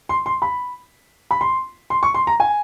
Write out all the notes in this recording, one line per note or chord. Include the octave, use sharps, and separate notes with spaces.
C6
C6
B5
B5
C6
C6
C#6
C6
A#5
G#5